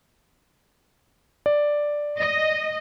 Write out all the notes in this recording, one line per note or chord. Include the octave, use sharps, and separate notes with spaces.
D5
D#5